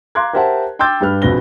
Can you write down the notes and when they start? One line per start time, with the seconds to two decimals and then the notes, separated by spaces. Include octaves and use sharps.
0.15 F5 A#5 C6 D6 F#6 G#6
0.33 G4 A#4 C5 E5 F#5 A5
0.79 G5 C6 D6 E6 G6 A6
1.01 G2 G3 B4 F6
1.22 A#1 F2 B2 B4 A#6 G7